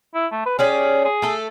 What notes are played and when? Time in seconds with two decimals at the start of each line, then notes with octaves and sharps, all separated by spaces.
0.14 E4
0.32 A3
0.46 B4
0.59 C#4 G4 G#4 D5
1.04 G#4
1.22 A3 A4